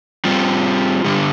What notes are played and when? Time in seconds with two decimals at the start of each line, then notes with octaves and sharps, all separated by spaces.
0.25 G3 C4 F4
1.05 G2 D3 G3